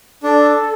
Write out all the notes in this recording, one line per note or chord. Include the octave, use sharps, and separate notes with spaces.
D4 A4